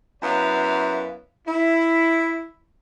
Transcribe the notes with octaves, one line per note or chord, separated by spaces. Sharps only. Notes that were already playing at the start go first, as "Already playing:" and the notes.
F#2 B3 E4 C#5 F5
E4